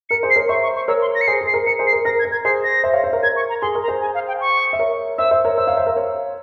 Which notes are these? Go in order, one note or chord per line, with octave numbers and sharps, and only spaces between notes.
A#4 C#7
G#4 C5
C7
A#4 C#5
C5 E5 C#6
C#6
C#6
A#4 C#5 E6
C6
A#6
C#7
G#4 C5 C7
G#4
C7
A#4
A#4 C#7
G#4 C5
C7
A#4
A#4 A#6
G#6
A#4
G#6
G#4 C5 C7
A#6
C5 E5
C#5 F5
C5 E5
A#4 C#5
A#4 G#6
C#6
A#5
G#4 C6
A#4
A#5
G#4 C5
G#5
F5
G5
C#6
E5
A#4 C#5
C5 E5 E6
C5 E5
A#4 C#5
C5 E5 E6
C#5 F5
C5 E5
A#4
C#5 F5